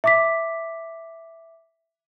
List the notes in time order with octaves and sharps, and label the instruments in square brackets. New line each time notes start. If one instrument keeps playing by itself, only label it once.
[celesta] E5 D6 B6